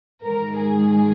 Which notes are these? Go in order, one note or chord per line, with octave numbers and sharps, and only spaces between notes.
G#2 D#3 A#4
G#4